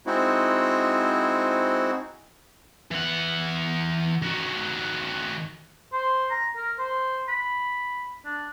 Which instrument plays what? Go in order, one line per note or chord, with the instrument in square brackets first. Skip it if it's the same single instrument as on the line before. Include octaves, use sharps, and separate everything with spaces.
[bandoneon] G#3 C4 D#4 E4 F#4 C5
[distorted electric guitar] E3 F#5
D#3 F#4
[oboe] C5
A#5
A#4
C5
B5
D4